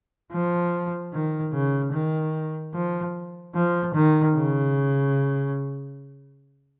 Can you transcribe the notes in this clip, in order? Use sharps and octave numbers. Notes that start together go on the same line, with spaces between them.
F3
D#3
C#3
D#3
F3
F3
D#3
C#3